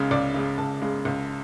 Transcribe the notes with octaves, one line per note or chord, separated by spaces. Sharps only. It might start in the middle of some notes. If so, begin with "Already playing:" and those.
Already playing: C#2 C#3 G#3
C#2 D5
C#3 G#3
C#2 A5
C#3 G#3
C#2